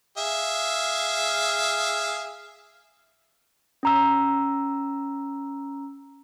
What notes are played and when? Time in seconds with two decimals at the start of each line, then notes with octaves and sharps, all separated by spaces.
0.17 G#4 E5 F5
3.83 C#4 A#5 E6